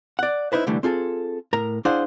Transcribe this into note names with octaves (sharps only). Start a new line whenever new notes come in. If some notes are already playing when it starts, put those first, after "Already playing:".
D5 F#5
D#4 E4 B4 C5
C2 D3 E3 G3 A3
C4 F4 G#4 A4
A2 A#4 A#5
D4 E4 G#4 C5 F5 F#5